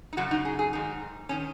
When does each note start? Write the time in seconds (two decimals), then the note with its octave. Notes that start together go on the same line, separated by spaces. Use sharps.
0.13 D#4
0.17 F#2 C#3 F#4
0.31 D#4
0.45 G#4
0.59 G#4
0.73 G#2 D#3 D#4
1.29 D#3 C#4